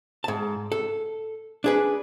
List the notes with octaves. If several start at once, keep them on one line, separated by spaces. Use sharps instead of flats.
G#2 A5
A4
D4 G#4 B4